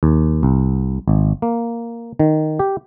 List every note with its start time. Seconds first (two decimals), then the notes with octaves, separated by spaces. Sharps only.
0.03 D#2
0.43 C2
1.08 G#1
1.42 A#3
2.20 D#3
2.59 G4